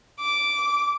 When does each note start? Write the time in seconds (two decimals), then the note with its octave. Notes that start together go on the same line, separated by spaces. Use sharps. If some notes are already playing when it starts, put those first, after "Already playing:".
0.20 D6